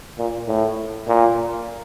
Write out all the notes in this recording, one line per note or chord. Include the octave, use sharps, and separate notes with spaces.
A#2
A2
A#2